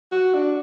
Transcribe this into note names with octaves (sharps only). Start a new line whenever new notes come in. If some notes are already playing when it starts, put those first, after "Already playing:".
F#4
D4